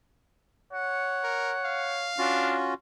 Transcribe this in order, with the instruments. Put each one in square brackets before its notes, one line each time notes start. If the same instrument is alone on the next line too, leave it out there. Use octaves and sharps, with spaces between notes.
[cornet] C#5 [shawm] F#5
[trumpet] A#4
F5
[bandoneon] C#4 F4 F#4 [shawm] D4